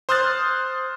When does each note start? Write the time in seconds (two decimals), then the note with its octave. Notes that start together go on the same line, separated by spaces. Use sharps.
0.09 C5 C6 D#6 F6 F#6 A6